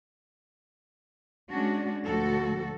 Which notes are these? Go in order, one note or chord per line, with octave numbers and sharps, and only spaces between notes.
G#3 C#4 D4 F#4
D2 A#2 F3 F#4 A4